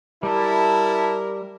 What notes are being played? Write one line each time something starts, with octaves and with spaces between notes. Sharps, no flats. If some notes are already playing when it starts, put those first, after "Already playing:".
G3 E4 A#4 A5